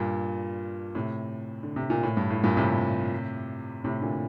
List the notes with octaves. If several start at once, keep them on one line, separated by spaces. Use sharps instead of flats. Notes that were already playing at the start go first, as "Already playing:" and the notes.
Already playing: G2 A#2
A2 C3
D3
C3
A#2
A2
G2
A2
G2 A#2
A2 C3
A2 C3
A#2 D3